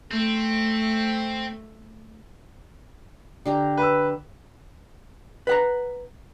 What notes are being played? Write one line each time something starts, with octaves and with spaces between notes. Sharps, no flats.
A3 C4
D3 G4 A#5
B4 E6
B4 F#5 A#5